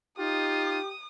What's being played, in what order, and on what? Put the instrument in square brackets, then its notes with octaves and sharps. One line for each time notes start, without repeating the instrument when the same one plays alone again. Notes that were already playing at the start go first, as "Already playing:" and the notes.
[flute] D#4 [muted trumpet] F4 [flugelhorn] G4 [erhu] D#6